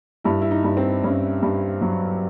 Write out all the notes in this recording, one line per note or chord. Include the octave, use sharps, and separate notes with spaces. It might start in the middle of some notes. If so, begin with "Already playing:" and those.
G2 E4
E4
D#4
G2
C4
G2 C#4
G2
F#3